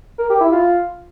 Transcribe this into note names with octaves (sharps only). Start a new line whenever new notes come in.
A#4
G4
E4
F4